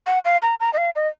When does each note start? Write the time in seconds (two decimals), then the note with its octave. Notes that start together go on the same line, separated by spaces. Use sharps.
0.06 F#5
0.25 F5
0.42 A#5
0.60 A#5
0.73 D#5
0.78 F5
0.96 D#5